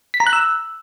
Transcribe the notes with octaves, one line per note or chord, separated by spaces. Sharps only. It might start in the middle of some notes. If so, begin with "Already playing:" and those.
B6
A#5
F#6
E6